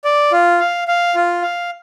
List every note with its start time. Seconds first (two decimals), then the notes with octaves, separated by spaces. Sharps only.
0.05 D5
0.32 F4
0.60 F5
0.88 F5
1.15 F4
1.43 F5